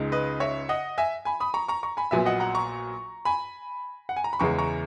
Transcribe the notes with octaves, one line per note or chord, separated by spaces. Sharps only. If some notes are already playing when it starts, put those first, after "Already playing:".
Already playing: C#2 C#3 G#3 D#4
B4 D#5
C#5 E5
D#5 F#5
E5 G#5
G#5 B5
B5 D#6
A#5 C#6
A#5 C#6
A#5 C#6
G#5 B5
A#1 A#2 F#3 B3 E5 G#5
D#5 F#5
F#5 A#5
A#5 C#6
G#5 B5
F#5
G#5
A#5
B5
E2 C#3 E3 G#3 C#4 A#5 C#6
A#5 C#6